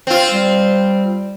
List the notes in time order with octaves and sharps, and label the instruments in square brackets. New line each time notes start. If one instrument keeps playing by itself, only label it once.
[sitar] C4 F4
[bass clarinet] G3